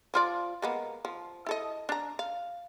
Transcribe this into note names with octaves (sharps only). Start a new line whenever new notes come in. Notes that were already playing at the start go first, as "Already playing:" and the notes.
F3 F4 D5
G#3 A#3 B3
F3
E4 A4 D#5
D4 A#5
F5